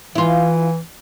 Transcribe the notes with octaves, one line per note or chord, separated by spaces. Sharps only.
E3 E4 F4